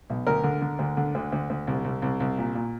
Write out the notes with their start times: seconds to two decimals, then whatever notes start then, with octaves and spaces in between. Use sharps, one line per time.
0.10 B1
0.27 D2 A#4
0.44 D3
0.62 D3
0.79 D2
0.97 D3
1.15 D2
1.32 D2
1.50 D2
1.67 C2
1.84 C2
2.02 C2
2.20 C2
2.38 A#2
2.55 A#2